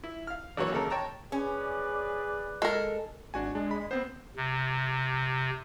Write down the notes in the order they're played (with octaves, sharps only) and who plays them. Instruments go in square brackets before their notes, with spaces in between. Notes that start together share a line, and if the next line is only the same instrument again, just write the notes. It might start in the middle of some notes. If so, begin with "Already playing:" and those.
[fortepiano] E4
F5 F6
A#1 E3 F#3 A#3 C#5
D#2 C#3 A4 A#4
C#5 G5 A5 A#5
[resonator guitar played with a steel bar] C#4 [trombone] G#4 [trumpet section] B4 D5
[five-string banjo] G#3 A#4 [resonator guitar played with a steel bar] A4
[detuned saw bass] G#1 [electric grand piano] D4 F#4 G#5
[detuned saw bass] G#3 [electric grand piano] D4
[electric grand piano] B5
[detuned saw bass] B3 [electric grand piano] C4 C5
[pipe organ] C3